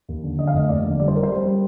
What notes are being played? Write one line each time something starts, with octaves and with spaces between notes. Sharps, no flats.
D#2
D3
D3 D#5
F5
F1 D#5
D#5
D#2 D5
D3
G3 D5
C5
G3 A#4
C5
G3
G3